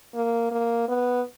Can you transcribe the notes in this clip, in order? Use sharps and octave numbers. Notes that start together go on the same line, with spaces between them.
A#3
A#3
B3